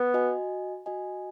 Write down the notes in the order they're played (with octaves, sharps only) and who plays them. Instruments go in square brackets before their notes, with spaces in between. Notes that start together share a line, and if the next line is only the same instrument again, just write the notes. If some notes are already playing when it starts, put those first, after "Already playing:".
Already playing: [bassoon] B3
[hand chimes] F#4 D#5 G#5
F#4 D#5 G#5